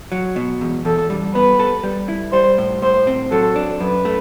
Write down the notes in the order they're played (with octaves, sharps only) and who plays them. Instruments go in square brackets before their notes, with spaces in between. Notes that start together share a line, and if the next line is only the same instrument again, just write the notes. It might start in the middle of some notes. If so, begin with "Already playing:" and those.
[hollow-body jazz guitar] F#3
B2
E2
[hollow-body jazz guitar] E2 [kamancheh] A4
[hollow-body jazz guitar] G3
[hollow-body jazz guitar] B3 [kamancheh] B4
[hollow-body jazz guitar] A4
G3
E4
[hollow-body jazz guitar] G3 [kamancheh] C5
[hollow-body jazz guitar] A2
[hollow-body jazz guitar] A2 [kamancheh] C5
[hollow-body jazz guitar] C4
[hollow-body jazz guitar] F#3 [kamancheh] A4
[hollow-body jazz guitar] D4
[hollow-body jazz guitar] F#2 [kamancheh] B4
[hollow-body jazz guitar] A3